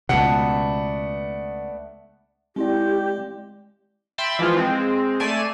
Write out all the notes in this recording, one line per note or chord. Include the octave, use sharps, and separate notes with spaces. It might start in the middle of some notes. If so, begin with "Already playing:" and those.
C#2 B2 A3 B3 D4 F#5
G#3 C4 E4 G4 D5
E5 G5 B5 C6 A6
E3 F3 G#3 F4
G#3 C4
A3 D5 G#5 C7 D#7 E7